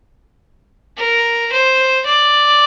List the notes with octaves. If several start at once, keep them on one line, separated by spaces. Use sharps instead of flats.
A#4
C5
D5